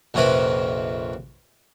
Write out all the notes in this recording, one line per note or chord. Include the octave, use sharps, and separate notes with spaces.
A#1 F2 C3 C#4 A#4 B4